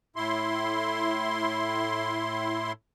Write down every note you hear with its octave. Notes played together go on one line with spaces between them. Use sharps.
A2 E4 C6